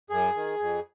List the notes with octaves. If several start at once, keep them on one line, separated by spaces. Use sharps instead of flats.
F#2 G#4
D#3
F2